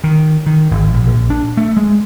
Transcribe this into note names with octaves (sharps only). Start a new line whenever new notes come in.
D#3
D#3
G#1
A#1
A#1
D4
A3
G#3